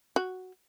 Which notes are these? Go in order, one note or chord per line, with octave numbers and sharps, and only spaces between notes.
F#4